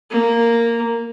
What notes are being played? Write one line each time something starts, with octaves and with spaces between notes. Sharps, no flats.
A#3